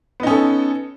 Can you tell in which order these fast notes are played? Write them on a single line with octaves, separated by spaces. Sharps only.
B3 D#4 C#4 A4